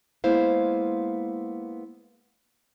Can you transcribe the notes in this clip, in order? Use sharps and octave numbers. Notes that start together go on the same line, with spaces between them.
G#3 A#3 B3 E4 C5 F5